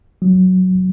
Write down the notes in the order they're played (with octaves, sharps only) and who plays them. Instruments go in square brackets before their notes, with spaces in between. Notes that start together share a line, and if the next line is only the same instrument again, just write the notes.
[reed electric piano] F#3